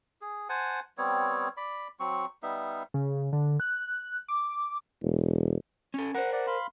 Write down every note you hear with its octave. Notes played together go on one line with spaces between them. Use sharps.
G#4
C5 F#5 G#5 A5
G3 B3 C4 C#5
D5 B5
F#3 C4 C#6
G3 B3 D#4 E5
C#3
D3
F#6
D6
E1
C#4 A4
A#4 C5 F#5
D5 F#5
F5 B5 C6